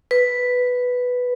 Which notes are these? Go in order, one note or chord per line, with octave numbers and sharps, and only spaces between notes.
B4